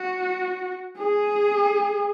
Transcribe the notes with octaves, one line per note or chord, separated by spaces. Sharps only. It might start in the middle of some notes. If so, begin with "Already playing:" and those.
Already playing: F#4
G#4